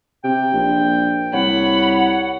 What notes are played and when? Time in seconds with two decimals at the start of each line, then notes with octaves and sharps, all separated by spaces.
0.24 C3 G5
0.54 A#1
1.34 C2 C#5 F#5 B5